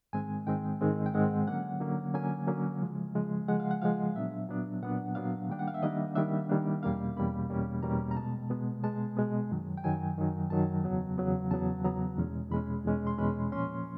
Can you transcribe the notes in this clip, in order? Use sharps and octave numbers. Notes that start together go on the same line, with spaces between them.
G#2 D#3 G#3 C4 G#5
G#2 D#3 G#3 C4 G5
G#2 D#3 G#3 C4
G5
G#2 D#3 G#3 C4 F#5
D3 F#3 A#3 C#4 F#5
D3 F#3 A#3 C#4
D3 F#3 A#3 C#4 G#5
D3 F#3 A#3 C#4
C#3 F3 G#3
C#3 F3 G#3
C#3 F3 G#3 F#5
F5
F#5
C#3 F3 G#3 F5
A#2 F#3 B3 D4 E5
A#2 F#3 B3 D4
A#2 F#3 B3 D4 F#5
A#2 F#3 B3 D4 F5
D#3 G3 A#3 D4 G5
F#5
F5
E5
D#3 G3 A#3 D4 D#5
D#3 G3 A#3 D4 E5
D#3 G3 A#3 D4
E2 B2 G3 A#3 C#4 F5
E2 B2 G3 A#3 C#4 B5
E2 B2 G3 A#3 C#4
E2 B2 G3 A#3 C#4 A#5
A#5
B2 G#3 B3 A5
B2 G#3 B3
B2 G#3 B3 A5
B2 G#3 B3
F#2 D#3 F#3
G5
F#2 D#3 F#3 G#5
F#2 D#3 F#3
F#2 D#3 F#3 A5
E2 C#3 F#3 B3
E2 C#3 F#3 B3
E2 C#3 F#3 B3 A5
E2 C#3 F#3 B3 A#5
E2 B2 G#3 C#4
E2 B2 G#3 C#4 B5
E2 B2 G#3 C#4
C6
E2 B2 G#3 C#4 B5
A#2 F3 A#3 C#4 C6